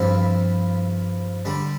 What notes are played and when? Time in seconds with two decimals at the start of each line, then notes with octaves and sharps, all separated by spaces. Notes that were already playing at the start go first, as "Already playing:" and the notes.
Already playing: G2 F3 C4 E4
1.45 D3 G3 D4